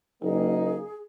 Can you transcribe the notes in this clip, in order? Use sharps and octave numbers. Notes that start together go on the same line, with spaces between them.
F#1 A#3 D#4 G#4